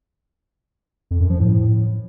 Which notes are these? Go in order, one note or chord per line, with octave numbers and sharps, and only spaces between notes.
F2
F#2
F3
A2